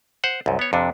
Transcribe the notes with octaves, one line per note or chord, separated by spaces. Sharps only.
C5 F#5
C2 F#2
B3 C#5
F2 C3 D4